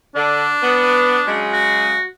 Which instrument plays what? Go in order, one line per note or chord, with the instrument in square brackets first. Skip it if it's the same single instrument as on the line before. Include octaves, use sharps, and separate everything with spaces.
[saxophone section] D3 [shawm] D4
[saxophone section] B3
C#3 F#3 G#3
[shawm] F#4